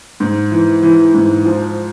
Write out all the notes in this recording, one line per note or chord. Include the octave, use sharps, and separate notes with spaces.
G#2
E3
E3
G#2
F3